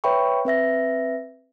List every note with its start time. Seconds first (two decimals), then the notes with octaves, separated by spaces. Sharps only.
0.04 B4 C#5 E5 G5 B5 C#6
0.45 C4 B4 E5 A#6